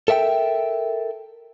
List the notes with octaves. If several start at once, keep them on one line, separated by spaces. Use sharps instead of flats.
A4 A#4 E5 F#5 G5